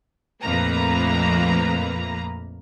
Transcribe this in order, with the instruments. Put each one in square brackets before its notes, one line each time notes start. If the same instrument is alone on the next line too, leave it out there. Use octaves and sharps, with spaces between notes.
[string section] A#1 F2 A3 A#3 B4 A#5